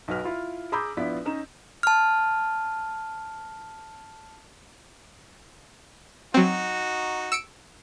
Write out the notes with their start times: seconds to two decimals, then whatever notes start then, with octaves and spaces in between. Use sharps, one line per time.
0.08 B1 F#4 B4 F6
0.24 E4 F4
0.72 G#4 A#5 B5 D6 E6 G6
0.97 A#1 B3 E4 F4 D5 B6
1.25 C#4 D#4 A#5 E7
1.83 A5 F6
6.34 F#3 C4 D#4 F#4
7.32 E6 C#7 D7